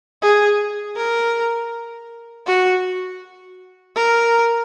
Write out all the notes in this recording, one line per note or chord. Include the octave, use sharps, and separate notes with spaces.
G#4
A#4
F#4
A#4